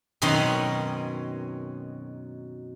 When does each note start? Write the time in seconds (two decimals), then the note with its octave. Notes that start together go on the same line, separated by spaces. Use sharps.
0.22 F#2 B2 D#3 C4 C#4 D#4